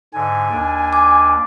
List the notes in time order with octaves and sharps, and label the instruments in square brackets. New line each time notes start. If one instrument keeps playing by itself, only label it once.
[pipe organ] G#2 D3 [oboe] G#5
[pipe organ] D#2 D4
[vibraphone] D6